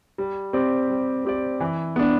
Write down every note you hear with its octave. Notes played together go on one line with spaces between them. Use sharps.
G3
C4 G4 D5
G3
C4 G4 D5
E3
B3 D4